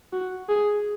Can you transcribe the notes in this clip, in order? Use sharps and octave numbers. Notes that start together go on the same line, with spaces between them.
F#4
G#4